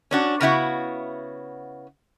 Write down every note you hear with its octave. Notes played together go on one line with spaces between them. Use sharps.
C#4 D4 F#4
C#3 B3 E4 F#4